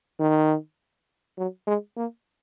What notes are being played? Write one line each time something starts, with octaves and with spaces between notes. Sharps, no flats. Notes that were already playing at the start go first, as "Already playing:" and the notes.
D#3
F#3
G#3
A#3